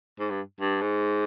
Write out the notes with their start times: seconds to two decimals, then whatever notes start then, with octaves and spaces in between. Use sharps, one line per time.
0.20 G#2
0.30 G2
0.61 G2
0.81 G#2